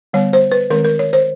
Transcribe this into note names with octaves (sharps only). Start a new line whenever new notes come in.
D3 G3 B3 C#5
C5
B4
D#3 G#3 C4 A#4
A#4
C#5
C5